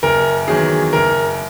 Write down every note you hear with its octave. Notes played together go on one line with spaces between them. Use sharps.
F#1 A#4
E2 D#3 F#3 G#4
F#1 A#4